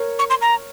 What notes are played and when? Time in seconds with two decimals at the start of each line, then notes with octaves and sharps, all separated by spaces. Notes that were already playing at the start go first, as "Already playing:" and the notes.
Already playing: A#4 C#5
0.19 C#6
0.30 C6
0.42 A#5